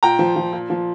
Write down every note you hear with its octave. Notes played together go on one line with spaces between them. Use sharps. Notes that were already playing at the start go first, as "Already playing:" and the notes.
A#2 G5 A#5
F3
F3
A#2
F3